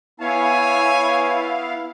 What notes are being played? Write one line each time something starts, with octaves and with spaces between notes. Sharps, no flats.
B3 E4 C#5 F5 G#5